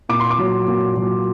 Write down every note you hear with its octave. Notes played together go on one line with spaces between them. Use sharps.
A#2 D6
C6
D6
F#3
A#2
F#3